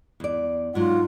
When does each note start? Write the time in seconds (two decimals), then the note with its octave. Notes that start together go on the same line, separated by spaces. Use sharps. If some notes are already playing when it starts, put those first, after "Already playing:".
0.20 E2 D5
0.75 G#2 F#3 F4